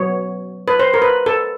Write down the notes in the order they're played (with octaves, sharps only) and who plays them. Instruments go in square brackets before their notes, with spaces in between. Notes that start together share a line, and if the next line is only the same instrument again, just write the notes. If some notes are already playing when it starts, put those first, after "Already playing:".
Already playing: [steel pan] F#3 B3 C#5
B4
C5
A#4
B4
A4